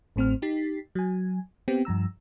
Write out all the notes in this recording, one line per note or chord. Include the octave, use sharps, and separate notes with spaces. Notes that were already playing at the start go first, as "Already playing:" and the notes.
A1 A2 C4 C5 F6
D#4 G4 A6 B6 C7
F#3 G#5
B3 C4 G4 G5
G2 F3 A#5 E6